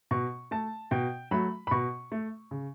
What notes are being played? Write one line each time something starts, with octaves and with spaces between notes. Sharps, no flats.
B2 C#6
A3 A5
B2 G5
F#3 A3 B5
B5
B2 C#6
A3
C#3